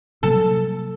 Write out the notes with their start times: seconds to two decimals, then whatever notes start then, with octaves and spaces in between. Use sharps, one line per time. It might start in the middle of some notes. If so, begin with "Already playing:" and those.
0.23 C3 F#3 A#3 A4